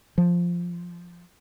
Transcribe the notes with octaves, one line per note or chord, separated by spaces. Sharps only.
F3